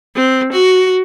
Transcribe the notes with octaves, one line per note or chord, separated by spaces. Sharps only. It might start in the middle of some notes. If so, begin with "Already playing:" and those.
C4
F#4